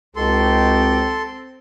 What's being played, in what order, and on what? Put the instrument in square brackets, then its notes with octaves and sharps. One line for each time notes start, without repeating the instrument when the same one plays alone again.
[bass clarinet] C#2 [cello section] C4 [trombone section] D#4 F#4 G4 [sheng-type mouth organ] A4 C6